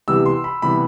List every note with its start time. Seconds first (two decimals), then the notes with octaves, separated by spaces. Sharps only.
0.08 C3 E3 G3 B3 E6
0.26 C6
0.44 B5
0.62 C3 E3 G3 B3 B5